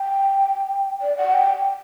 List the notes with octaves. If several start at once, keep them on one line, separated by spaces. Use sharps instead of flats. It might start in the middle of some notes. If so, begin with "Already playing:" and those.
Already playing: G5
D5
F#5
G5